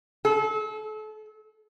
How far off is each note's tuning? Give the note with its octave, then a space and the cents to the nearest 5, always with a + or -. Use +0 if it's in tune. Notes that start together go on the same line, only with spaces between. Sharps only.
A4 -35